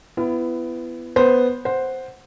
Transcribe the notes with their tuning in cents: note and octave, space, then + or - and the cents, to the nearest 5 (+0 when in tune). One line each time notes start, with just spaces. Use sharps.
B3 +15 E4 +30
B3 +0 C5 +0
C5 +0 F#5 +0